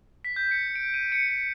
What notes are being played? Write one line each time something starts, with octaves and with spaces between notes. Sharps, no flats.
B6
G6
C#7
D7
D#7
C#7
C#7